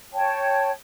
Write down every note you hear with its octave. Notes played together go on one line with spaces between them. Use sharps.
C#5 G5 A5